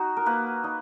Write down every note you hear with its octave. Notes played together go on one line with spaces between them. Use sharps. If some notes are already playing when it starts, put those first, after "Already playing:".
Already playing: D#4 F#4
A#4
A#3 B4
D#4